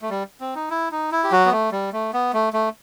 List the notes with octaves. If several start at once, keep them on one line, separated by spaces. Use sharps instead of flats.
A3
G3
C4
D#4
E4
D#4
E4
G4
F#3 F#4
B3
A3
G3
A3
B3
A3
A3